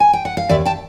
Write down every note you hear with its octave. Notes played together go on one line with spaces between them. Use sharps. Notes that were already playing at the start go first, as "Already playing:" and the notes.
G#5
G5
F#5
F5
D#2 D5 E5
G5 A5